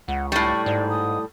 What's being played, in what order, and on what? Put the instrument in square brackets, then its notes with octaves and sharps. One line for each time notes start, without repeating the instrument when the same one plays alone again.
[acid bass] C#2 [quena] F#5
[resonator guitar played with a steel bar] A2 G3 [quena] C#6
[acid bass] G#2 [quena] D5
[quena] D#6